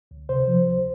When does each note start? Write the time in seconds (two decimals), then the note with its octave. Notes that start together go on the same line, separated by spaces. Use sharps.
0.11 D2
0.29 C3 C5
0.48 F3
0.67 D2